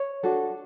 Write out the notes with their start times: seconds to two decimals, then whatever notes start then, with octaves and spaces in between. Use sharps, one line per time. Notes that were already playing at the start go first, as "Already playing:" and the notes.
Already playing: C#5
0.23 D4 F#4 A4